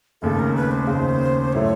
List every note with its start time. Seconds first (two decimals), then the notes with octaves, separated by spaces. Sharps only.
0.22 F1 D#2 C#3 A4
0.39 A#4
0.56 B4
0.71 C5
0.87 F1 D#2 C#3
1.53 A2 F#3 A3 C#5